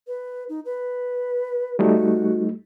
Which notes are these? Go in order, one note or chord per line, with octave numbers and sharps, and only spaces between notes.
B4
D#4
B4
G3 A3 D#4 F#4